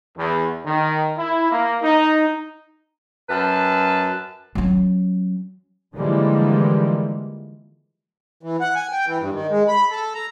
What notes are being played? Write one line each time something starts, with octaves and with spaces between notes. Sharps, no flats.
E2
D#3
E4
A#3
D#4
F#2 B4 A5
F#3 C#4
D3 E3 F3 G3 G#3 A#3
E3
F#5
G#5
G5
E3
G2
D#3
G#3
B5
A4
A#5